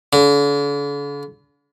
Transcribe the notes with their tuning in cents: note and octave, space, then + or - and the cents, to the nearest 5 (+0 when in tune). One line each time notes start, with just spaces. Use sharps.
D3 -45